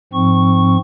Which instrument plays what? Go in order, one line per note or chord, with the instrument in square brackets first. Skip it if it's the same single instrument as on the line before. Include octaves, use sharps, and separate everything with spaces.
[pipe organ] G#2 F3 C4 C#6